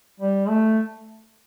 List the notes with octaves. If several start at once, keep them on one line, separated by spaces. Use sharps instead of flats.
G3
A3